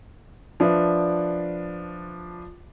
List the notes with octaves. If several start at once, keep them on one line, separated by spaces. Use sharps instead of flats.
F3 D4 B4 D5 E5